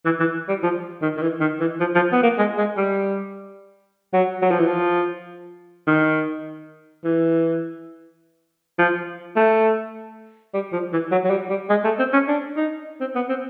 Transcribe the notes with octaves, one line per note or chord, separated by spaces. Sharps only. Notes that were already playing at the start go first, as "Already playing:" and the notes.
E3
E3
G3
F3
D#3
D#3
E3
D#3
E3
F3
F3
B3
A#3
G#3
G#3
G3
F#3
F#3
F3
E3
F3
D#3
E3
F3
A3
G3
F3
E3
F#3
F#3
G3
G3
G#3
A3
C4
C#4
D4
D#4
C4
B3
C4